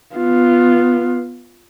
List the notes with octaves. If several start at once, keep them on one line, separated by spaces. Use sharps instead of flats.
B3 F4